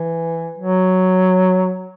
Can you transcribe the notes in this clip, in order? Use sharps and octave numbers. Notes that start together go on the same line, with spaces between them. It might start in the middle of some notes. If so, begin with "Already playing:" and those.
Already playing: E3
F#3